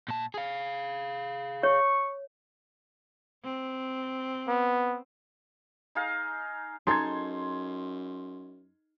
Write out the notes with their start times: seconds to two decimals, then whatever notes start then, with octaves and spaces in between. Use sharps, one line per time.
0.08 A#2 A5
0.34 G#4 F5
1.63 C#5 C#6
3.44 C4
4.48 B3
5.95 D#4 G#4 F5 A#5
6.87 F#2 D#4 G#4 A4 C6 G#6